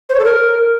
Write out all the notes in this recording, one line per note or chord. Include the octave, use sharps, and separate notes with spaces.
C5
C#5
A4
A#4